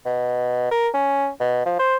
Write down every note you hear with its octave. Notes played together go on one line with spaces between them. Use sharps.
B2
A#4
C#4
B2
F3
C5